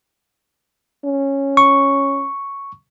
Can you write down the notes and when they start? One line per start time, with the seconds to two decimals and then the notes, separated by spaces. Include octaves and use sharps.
1.05 C#4
1.57 C#6